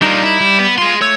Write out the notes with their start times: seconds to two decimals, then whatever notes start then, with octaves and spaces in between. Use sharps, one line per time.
0.02 G3 D4 D#4 F4 A#4
0.24 E4
0.41 G3
0.59 B3
0.78 F4 G#4 C6
1.01 A3 C#5 E6